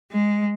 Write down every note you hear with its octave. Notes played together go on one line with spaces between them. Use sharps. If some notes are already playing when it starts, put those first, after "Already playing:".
G#3